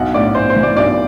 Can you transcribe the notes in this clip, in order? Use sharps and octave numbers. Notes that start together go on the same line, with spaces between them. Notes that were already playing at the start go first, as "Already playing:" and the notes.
Already playing: B1 F#5
A2 D5
B1 C5
C5
E3
D5
B1 D5